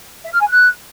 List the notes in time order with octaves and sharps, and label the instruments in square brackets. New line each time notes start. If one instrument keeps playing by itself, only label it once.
[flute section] E5
F6
G#5
F#6